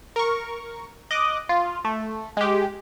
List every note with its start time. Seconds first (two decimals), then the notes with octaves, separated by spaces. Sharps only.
0.16 A#4 C#6
1.11 D#5 D6 F#6
1.49 F4
1.85 A3
2.37 G#3 G4